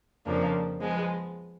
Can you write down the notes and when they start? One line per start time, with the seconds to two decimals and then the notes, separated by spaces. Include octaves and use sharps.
0.26 F2 C#3 F3 A#3 D4
0.80 F3 G#3 B3